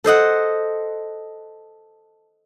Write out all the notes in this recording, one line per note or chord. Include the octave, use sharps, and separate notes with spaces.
A4 C5 D#5 F#5